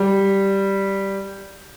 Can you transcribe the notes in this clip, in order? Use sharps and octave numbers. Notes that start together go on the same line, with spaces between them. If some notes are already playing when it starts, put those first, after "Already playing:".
Already playing: G3